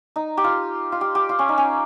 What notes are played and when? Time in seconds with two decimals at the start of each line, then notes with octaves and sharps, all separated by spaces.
0.16 D#4
0.37 G4
0.44 F4
0.92 F4
1.01 G4
1.15 G4
1.29 F4
1.39 C#4
1.49 D#4
1.58 C#4